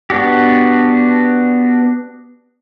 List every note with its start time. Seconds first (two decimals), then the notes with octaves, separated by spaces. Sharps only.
0.10 B3 D4 F#4 G4